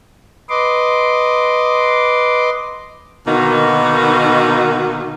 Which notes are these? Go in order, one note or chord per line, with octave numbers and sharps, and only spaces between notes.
B4 D#5 C6 D6
B2 D3 D#3 A#3 D#4 F#4